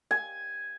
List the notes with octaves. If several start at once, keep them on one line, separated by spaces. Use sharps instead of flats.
G#5